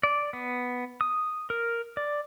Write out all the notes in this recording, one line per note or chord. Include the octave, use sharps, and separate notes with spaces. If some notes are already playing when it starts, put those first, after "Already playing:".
D5
B3
D#6
A#4
D5